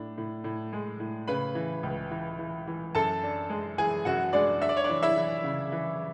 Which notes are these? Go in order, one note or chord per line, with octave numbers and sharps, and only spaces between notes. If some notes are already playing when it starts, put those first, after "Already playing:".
Already playing: A2 D4
A2
A2
G#3
A2
C#3 B4 B5
E3
C#2
E3
E3
E3
F#2 A4 A5
D4
G#3
E3 G#4 G#5
F#2 F#4 F#5
G#3 D4 D5
D4 E5
D5
C#5
D4 D5
E3
E4 E5
E3
C#3
E3